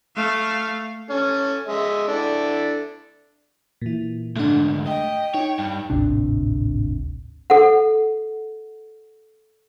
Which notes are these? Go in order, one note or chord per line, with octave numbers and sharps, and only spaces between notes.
A3 F5
C#4 A4
G#3 D#5 E5
D4 E4 A4
A#2 E3
D2 G#2 A3 D4
D#5 G5
D#4 C#5
G2
D1 G#1 C3 D4
A4 F#5